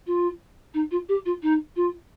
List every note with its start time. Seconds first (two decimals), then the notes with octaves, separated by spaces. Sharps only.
0.07 F4
0.74 D#4
0.91 F4
1.08 G4
1.25 F4
1.42 D#4
1.76 F4